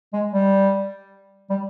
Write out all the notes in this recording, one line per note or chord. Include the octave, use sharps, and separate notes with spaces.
G#3
G3
G3